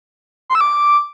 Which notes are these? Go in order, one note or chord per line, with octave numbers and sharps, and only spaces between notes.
C6
E6
D6